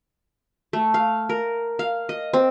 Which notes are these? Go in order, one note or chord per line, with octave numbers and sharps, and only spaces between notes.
A3
F5
A#4
F5
D#5
C4